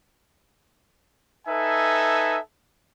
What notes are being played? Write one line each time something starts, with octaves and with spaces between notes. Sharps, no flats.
D#4 A4 B4 E5 G#5